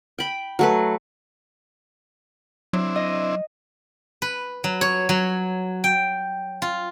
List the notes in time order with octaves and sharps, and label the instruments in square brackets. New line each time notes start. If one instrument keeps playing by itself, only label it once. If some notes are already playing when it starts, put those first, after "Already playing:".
[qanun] G5 B5
F#3 A3 B4
[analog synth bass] F#3 [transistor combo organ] C4 D4 E4
[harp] D#5
[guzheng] B4
F#3
C#5
F#3
G5
F4